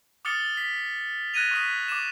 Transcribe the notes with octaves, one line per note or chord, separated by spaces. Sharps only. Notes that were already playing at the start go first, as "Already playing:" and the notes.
D6 D#6 F6 A6 C#7 G7
B6
F#6 G#6 A#6 D#7 F7
C#6 D#6 B6
D6 E7